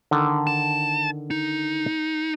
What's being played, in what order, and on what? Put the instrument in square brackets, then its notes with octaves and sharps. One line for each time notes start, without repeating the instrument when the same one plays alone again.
[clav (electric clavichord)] D3 D#3 A4
[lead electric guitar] A5
D#4